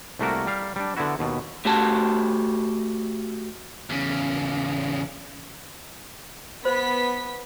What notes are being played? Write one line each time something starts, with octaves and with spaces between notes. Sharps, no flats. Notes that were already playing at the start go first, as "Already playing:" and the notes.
C2 A3 A#3 F#4 A#4
G3 F5
G3 D4
D3 B3 E4 F#4
D#2 B2
A3 F#4 G4 A5
E2 C#3
B3 C5 B5 B6